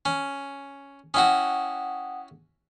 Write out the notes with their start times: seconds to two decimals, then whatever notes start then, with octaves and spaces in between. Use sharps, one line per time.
0.05 C#4
1.14 C#4 E4 F#4 F#5 G5 D#6